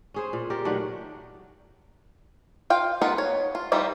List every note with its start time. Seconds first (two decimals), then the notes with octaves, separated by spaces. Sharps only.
0.14 C#4 G#4 C5
0.33 A#2
0.50 G4 A#4 D5
0.65 D#3 F#3 A3 D4
2.70 F4 F5 G5
3.01 B3 D#4 F4 A#4 F#5
3.18 C#5
3.55 F4
3.72 E3 G3 D#4 F4